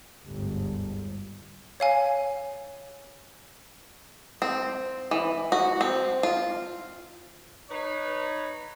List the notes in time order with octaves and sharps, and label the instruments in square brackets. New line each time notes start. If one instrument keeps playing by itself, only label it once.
[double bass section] G1 D2 G#2
[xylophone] C#5 F5 G#5
[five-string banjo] C4
E3
F#4
C4
F4
[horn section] D#4 B4 C#5